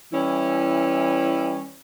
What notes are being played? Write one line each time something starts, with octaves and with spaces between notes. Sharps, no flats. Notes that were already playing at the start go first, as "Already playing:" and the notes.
E3 G3 C#4 E4